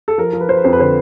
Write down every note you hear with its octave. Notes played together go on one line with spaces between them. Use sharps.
A4
F3 A#4
F3
B4
F3 C5
B4
F2 C5
B4
D3 C5